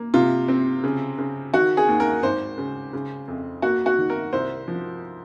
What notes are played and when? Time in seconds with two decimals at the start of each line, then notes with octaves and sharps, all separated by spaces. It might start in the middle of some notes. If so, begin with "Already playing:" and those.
Already playing: A#3
0.14 C3 F4
0.48 C4
0.84 C#3
1.18 C#3
1.54 D#3 F#4
1.77 G#4
1.88 D#2
2.00 A#4
2.23 G#1 C5
2.58 C#3
2.93 C#3
3.28 F2
3.62 A#3 F#4
3.86 F#4
3.98 D#3
4.10 A#4
4.33 C2 C5
4.68 F3